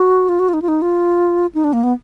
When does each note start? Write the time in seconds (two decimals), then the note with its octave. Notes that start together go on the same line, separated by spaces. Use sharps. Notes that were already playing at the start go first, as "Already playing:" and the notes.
Already playing: F#4
0.29 F4
0.39 F#4
0.49 F4
0.54 D#4
0.62 F4
0.68 D#4
0.82 F4
1.55 D#4
1.64 D4
1.73 A#3
1.83 B3